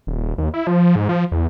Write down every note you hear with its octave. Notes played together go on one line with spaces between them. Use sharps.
D#1
D#2
E4
F3
G#2
F3
E2